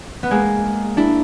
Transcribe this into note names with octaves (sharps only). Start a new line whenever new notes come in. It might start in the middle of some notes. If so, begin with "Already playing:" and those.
B3
G#3 A#3
D4 E4